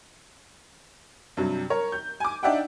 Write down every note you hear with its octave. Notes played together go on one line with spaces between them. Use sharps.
G2 C3 F#3
A#4 C#5
G6
G#5 D6
D4 D#4 D5 E5 F#5 G5